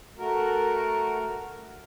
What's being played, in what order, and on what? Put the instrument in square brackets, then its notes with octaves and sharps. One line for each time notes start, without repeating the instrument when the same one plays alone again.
[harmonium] A3 F#4 A#4